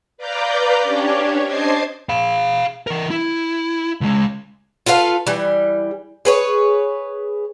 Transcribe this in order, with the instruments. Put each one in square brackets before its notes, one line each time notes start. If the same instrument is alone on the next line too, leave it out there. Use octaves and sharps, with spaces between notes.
[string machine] B4 D5 F5 A#5 D6 G6
C#4 D4 G4 C#5
C5 D#5 A5 D6 G#6 C7
[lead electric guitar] F5 B5
E3 A#4
E4
C#2 G#3
[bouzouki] F4 A4 B4 F5
E3 G3
G#4 B4 C#5